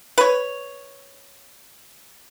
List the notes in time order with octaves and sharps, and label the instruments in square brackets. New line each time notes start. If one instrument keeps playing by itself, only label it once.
[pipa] B4 C#5